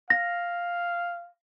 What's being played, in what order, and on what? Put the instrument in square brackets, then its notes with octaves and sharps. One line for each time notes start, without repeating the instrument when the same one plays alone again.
[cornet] F5 [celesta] A#6